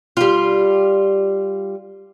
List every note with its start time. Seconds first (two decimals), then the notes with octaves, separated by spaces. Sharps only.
0.17 G3 F4